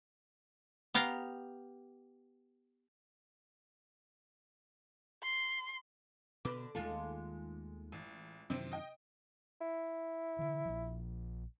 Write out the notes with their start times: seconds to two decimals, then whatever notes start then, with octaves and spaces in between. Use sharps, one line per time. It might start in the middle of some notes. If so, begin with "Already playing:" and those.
0.94 B3 G4 F5 A#5
5.23 C6
6.45 B2 D3 D4 B4 D6
6.75 D#2 D#3 G#3 A3 F4 A4
7.92 A1
8.50 F#2 C3 D#3 E3 C4
8.72 D#5 G5
9.61 E4
10.39 D3 E3
10.65 A#1 F3